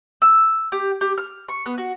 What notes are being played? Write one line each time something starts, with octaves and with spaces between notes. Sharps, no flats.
E6
G4
G4
F6
C#6
B3
F#4